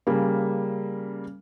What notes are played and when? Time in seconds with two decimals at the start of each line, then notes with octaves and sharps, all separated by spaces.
0.07 C#3 G3 A#3